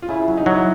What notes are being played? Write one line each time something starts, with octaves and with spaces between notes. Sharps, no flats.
F4
C#3 E4
F#3
D#4
F#3
E4